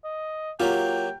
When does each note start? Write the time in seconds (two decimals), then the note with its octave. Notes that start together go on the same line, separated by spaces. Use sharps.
0.04 D#5
0.60 F#3 A#3 F4 G4 G5